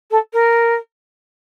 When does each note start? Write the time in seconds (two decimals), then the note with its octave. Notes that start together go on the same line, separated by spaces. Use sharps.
0.11 A4
0.33 A#4